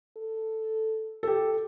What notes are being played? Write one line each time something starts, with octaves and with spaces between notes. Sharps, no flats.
A4
G4 A4